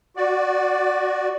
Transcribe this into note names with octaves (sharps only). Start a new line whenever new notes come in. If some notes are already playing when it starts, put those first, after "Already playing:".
F#4 D5